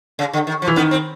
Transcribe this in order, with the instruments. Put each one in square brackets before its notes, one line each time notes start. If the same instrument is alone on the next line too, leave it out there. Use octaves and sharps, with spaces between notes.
[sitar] C#3
D3
D#3
F3
[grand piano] E3
[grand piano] D#3 [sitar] B3
[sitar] C4